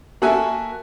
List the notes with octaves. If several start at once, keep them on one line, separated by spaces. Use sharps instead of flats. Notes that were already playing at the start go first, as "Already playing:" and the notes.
A#3 F#4 A4 E5 G#5